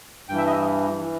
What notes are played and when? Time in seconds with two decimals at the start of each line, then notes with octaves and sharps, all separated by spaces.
0.29 G2 E3 G5
0.38 E5
0.47 D#5
1.00 E3